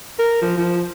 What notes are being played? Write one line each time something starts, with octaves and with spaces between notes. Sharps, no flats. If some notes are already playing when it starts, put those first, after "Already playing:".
A#4
F3
F3